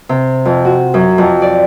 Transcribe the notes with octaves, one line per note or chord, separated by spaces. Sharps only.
C3
F2
F#4
F#2
F2
D5